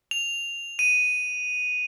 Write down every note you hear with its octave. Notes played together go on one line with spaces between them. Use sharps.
F7
D#7